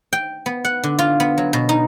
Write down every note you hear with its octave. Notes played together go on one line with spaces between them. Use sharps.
G5
B3
F#5
D3
F4
B3
F#3
B2
D#4